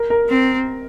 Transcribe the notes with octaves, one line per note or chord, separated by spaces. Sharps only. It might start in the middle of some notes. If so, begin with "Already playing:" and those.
Already playing: A#4
A#4
C4